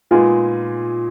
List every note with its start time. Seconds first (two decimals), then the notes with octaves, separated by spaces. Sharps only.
0.11 A#2 G#3 B3 D#4 F4 G#4